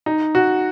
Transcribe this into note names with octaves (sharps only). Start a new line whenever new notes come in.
D#4
F#4